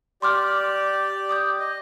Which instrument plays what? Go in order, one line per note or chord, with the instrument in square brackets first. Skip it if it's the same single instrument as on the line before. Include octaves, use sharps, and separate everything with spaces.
[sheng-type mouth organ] G4 D5 [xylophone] C6 D6 F6
[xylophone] D6 D#6 G6
[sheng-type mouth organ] D#5